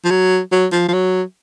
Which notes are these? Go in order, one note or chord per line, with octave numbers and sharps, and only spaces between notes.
F3
F#3
F#3
F3
F3
F#3